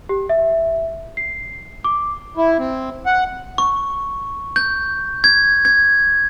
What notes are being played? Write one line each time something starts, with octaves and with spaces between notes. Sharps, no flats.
G4
E5
C7
D6
E4
C4
F#5
C#6
G6
G#6
G#6